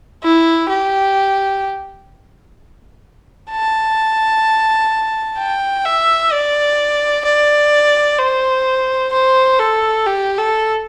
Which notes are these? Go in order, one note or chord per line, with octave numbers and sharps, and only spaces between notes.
E4
G4
A5
G5
E5
D5
D5
C5
C5
A4
G4
A4